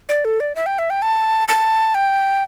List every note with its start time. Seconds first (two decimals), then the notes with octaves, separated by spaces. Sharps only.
0.09 D5
0.25 A4
0.40 D5
0.55 E5
0.66 G5
0.79 E5
0.90 G5
1.02 A5
1.48 A5
1.95 G5